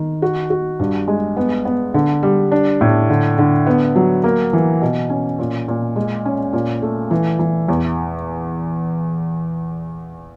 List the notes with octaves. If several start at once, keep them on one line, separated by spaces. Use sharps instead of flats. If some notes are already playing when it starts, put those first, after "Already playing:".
Already playing: D#3
F#4
F#4
G2
G#3
B3
B3
D3
G3
D4
A2
D3
D3
B3
F#3
A#3
E3
B2
C#4
A#2
A#2
G#3
C#4
A#2
A3
E3
E3
E2